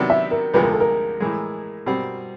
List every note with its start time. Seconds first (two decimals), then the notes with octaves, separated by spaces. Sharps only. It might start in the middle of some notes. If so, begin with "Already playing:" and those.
Already playing: C3 D#3 F#3 B3 D4
0.10 E5
0.31 A#4
0.54 D2 C3 F3 G#3 B4
0.63 A#4
0.72 A4
0.80 A#4
1.20 A2 E3 G#3
1.86 B2 G3 C4